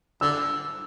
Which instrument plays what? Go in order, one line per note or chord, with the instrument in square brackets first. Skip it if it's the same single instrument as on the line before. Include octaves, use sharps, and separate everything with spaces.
[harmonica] D3 [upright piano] E6